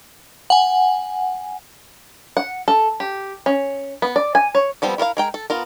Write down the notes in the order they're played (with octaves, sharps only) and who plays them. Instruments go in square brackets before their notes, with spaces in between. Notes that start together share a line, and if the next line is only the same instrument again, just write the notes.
[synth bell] F#5 G#5
[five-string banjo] F#5
A4
G4
C#4
B3
D5
G#5
C#5
F3 G3 B3 C4
E4 A#4 E5 F5
G#3 A#4 G5
A4
B3 F4 A#4